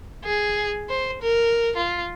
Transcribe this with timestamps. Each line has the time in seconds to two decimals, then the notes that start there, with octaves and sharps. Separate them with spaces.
0.24 G#4
0.89 C5
1.22 A#4
1.76 F4